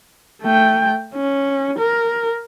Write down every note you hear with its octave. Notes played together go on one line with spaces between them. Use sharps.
A3 G5
C#4
A#4